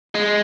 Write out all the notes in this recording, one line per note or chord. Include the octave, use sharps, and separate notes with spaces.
G#3